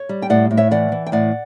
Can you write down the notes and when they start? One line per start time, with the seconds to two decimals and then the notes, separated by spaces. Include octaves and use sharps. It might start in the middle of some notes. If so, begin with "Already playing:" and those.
Already playing: C#5
0.09 G3
0.22 G5
0.30 A2 D5 F#5
0.51 A2
0.57 C#5 E5
0.71 E3 D5 F#5
0.92 E3
1.06 G5
1.12 A2 D5 F#5